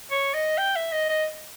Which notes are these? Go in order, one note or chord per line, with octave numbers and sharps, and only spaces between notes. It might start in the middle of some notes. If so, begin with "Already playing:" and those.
C#5
D#5
G5
E5
D#5
D#5